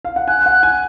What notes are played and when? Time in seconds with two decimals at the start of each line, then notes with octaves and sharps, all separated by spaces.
0.05 F5
0.16 F#5
0.28 G#5 F#6
0.46 F#5
0.63 G#5